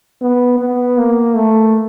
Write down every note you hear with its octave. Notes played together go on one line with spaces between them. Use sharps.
B3
B3
A#3
A3